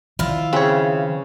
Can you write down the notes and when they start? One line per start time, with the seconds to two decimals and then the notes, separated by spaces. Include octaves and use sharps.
0.19 D#3 F3 E4 F4
0.53 C#3 C4 B4 C#5